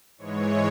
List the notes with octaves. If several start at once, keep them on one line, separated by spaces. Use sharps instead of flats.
G#2 E3 G#3 C#5